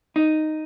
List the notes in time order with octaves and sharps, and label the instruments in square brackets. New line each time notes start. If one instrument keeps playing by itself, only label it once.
[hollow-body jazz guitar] D#4